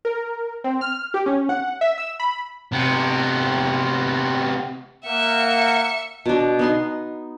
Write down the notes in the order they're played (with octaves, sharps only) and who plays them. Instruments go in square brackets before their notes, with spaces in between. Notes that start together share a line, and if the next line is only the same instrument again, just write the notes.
[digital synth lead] A#4
C4
F6
G4
C#4
F#5
E5
E6
B5
[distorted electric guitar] C3 B3
[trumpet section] A#3 F#5 [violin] E5 C#7
[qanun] B2 D4
B3 D#4 C6